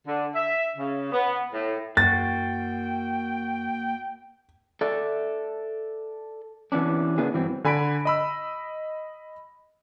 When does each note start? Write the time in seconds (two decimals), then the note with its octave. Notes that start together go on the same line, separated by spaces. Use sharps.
0.07 D3
0.35 E5
0.77 C#3
1.12 B3
1.53 A2
1.97 F#2 A#3 F#4 G5 A6
4.81 A4 D5 E5
6.72 C3 E3 B3 C#4 D4
7.18 C#3 A#3 B3 D4 E4 G#4
7.34 G2 E3 F#3 C4
7.64 D3 G#5 B5 B6 D7
8.05 D#5 B5 E6